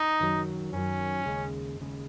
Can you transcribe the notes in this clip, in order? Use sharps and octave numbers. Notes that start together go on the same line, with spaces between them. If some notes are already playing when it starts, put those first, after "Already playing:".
Already playing: D#4
F#2 D#3 F#3
F#2 D#3 F#3 C#4
D#2 C#3 G#3
D#2 C#3 G#3